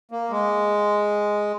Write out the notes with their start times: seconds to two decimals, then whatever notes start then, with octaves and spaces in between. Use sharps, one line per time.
0.11 A#3
0.30 G#3